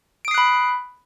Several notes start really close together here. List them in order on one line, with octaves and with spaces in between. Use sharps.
D7 D#6 C7 F#6 B5